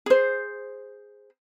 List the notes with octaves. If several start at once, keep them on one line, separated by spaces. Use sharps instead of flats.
G#4 C5